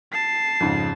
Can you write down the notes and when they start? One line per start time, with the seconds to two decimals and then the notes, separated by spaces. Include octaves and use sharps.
0.13 A5 C7
0.60 F2 G#2 C#3